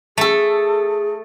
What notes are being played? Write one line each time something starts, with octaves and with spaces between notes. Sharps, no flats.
A3 G#4 A4